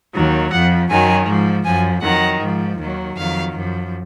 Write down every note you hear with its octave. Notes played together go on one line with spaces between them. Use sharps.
D#2 D#3 F#3
F2 F3 F#5
F#2 D#3 F#3 G#5
G#2 F3
F#2 F3 G#5
F2 D#3 F#3 F#5
G#2 F3
D#2 D#3 F#3
F2 D#3 F#3 F5
F#2 F3